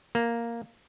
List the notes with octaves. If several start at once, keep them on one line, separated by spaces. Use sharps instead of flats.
A#3